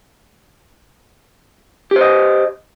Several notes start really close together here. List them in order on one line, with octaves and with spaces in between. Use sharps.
G4 C5 D#5